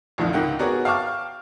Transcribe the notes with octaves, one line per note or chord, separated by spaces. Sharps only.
C2 F2 A#2 D3 D#3 F3
C#2 G#2 A#3 D#4 F#5 G5
B3 F#4 G#4 A#4 C#5 D5
F5 G5 A5 C#6 D6 F6